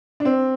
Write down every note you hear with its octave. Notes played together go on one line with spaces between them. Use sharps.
D4
C4